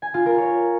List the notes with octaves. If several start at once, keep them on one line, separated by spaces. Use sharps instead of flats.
G#5
F4
A#4
C#5